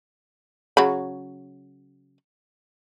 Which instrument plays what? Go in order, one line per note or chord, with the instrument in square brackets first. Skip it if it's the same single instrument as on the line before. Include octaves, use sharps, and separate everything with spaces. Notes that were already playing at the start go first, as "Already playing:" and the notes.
[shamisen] C#3 F#3 B5